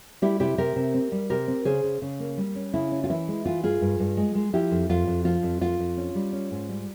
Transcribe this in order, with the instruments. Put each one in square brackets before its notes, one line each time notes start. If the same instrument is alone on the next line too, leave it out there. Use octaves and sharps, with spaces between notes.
[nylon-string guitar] G3 E4 G4
C3 E4 G4
C3 G4 A#4
C3
C4
G3
C3 G4 A#4
C4
C#3 G#4 C5
C#3
C#3
A#3
G3
C#4
C#3 E4
C#4
F4
E3 E4
G#3
E3 F4
G2 F4 G#4
G2
G2
G#3
G#3
F3 E4 G4
F2
F2 F4
F2
F3 F4
F2
F2 F4
F2
C#4
G3
C#4
G#2
G3